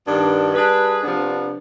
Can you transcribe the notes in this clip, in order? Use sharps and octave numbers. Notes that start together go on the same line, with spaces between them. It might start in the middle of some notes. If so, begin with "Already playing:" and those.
G2 D#3 B3 D4
G3 D4 G#4 B4
C3 F3 B3 D4